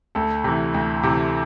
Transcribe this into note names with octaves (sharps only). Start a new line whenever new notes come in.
D2 A4
C3 E3
D2
C3 E3